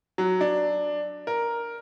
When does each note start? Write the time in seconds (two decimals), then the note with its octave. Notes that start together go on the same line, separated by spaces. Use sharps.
0.18 F#3
0.41 D4
1.27 A#4